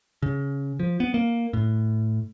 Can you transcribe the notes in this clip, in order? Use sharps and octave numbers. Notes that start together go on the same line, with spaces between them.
C#3
F3
B3
A#3
A2